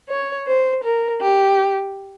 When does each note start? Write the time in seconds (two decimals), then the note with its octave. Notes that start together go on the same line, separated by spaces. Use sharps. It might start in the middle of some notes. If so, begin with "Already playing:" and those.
0.09 C#5
0.47 C5
0.83 A#4
1.21 G4